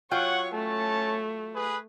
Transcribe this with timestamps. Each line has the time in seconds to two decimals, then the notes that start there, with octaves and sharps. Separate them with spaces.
0.11 F#3 F4 C#5 F#5 G5
0.54 A3 C#4 C#5 A5
1.55 G#4 B4